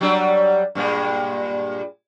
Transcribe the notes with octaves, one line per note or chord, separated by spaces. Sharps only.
F#3 G3 D4
G2 A#2 G#3